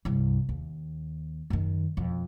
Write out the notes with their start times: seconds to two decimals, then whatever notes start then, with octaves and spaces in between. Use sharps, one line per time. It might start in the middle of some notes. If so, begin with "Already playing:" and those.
0.05 C2 G2
0.49 D#2
1.50 F#2 D#3
1.97 E1 F2